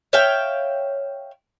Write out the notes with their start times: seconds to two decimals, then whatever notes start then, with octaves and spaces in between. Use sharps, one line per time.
0.13 C#5 E5 F5 G5